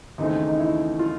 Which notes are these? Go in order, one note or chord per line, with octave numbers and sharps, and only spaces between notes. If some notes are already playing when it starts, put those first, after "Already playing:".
D#2 C#3 E3 A3 C4 D#4
D#4
E4
F4